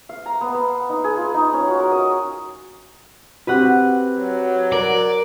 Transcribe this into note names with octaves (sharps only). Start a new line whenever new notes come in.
F5
A#5
B3
B3
D#4
G#4
F4
D#4
C#4
F#4
A#4
D#5
C4 F#4 G4 B4 F#5
F#3
A#4 D5